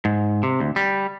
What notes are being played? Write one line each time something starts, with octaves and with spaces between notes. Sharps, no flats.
G#2
C3
D2
G3